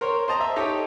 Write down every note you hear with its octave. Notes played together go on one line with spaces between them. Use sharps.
A#4 C5 C#5
C5 D#5 A5 A#5
E5
D#4 G4 A4 C#5